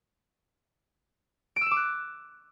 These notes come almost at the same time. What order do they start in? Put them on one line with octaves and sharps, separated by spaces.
D7 E6 E7 D6 F#6